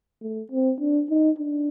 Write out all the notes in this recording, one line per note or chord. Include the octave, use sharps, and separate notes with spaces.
A3
C4
D4
D#4
D4